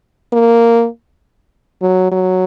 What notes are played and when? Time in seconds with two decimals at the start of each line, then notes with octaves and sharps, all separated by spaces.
0.33 A#3
1.82 F#3
2.12 F#3